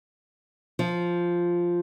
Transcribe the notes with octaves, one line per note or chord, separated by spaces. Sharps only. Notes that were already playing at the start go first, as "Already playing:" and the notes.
F3